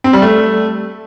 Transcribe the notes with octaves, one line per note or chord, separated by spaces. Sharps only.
C4
G3
A3